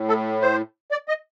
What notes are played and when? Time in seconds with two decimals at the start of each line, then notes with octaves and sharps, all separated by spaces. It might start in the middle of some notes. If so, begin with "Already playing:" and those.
Already playing: A2
0.08 A4
0.42 C5
0.91 D5
1.08 D#5